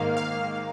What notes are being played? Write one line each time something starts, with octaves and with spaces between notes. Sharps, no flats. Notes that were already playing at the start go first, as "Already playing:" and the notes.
Already playing: G#2 D#3 A#3 F5
F5